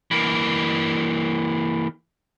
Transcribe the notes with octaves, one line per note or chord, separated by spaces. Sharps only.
E3 A#3